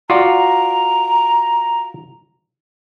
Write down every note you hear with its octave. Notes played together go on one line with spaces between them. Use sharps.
F4 F#4 D5 A#5